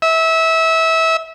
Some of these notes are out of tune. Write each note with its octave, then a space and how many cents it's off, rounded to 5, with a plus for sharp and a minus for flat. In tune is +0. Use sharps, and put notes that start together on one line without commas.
E5 -25